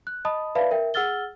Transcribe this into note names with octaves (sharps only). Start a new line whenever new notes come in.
F#6
D#5 A5 B5 D#6
B4 D5 E5 F5 A5 B5
A#4 E5 G5
G#4 F#5 E6 F6 A6 G7